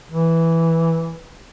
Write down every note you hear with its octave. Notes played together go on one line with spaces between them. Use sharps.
E3